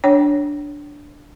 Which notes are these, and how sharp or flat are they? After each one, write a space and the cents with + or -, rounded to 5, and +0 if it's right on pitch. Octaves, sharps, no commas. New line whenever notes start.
D4 +0 C#5 +0 G5 -30